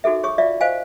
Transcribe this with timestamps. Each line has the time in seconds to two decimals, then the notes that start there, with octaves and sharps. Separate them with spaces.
0.04 D#4 F#4 G#4 A4 E5
0.24 G#4 C#5 C#6 D#6
0.38 F4 D5 E5 F5
0.61 C5 D#5 F5 G#5